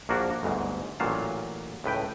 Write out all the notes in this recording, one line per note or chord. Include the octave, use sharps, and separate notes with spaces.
A#1 A#3 D4 F#4 A#4
G1 D2 G#2
A1 A#2 F#3 F5 A5
C#2 A2 B4 G5